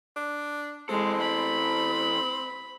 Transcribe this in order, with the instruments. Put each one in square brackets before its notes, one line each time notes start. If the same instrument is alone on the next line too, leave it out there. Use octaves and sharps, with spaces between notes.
[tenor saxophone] D4
[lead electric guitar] E3 A4 [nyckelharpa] G#3 [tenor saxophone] C4
[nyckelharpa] B5